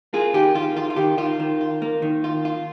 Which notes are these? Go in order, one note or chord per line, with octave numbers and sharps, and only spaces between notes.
A#3 F4 G#4
D#3 G4
D#3 F4
D#3 F4
F4
D#3 G4
D#3 F4
D#3
F4
A#3
D#3
F4
F4